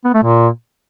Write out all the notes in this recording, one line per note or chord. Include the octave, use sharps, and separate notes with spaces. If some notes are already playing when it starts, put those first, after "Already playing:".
B3
A3
A#2